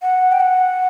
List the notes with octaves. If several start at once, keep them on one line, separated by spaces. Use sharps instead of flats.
F#5
G5
F#5